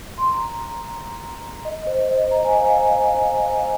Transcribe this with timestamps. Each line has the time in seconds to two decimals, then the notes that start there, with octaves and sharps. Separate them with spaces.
0.18 C6
0.32 A#5
1.65 D#5
1.87 C5
2.09 D#5
2.31 A#5
2.45 G#5
2.58 F5